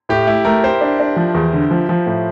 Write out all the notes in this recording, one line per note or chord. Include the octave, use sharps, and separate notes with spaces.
A2 G4
A3 E4
A3 A#4
G4 C5
D4
D4
F3
E2
D3
F3
F3
A2